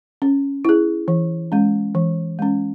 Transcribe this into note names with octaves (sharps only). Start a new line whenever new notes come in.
C#4
E4 G#4
E3
G#3 C#4
E3
G#3 C#4